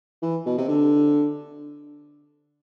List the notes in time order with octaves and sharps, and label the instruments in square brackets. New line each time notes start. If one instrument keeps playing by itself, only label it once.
[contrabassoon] E3
B2
C3
D3